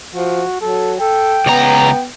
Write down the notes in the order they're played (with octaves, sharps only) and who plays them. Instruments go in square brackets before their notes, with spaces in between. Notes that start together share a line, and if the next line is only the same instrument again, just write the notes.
[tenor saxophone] F3 [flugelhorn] F#4
[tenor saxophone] F#3 [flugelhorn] A4
[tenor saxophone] A4 [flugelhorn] G5
[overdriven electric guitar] C#2 A#5 [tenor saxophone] B3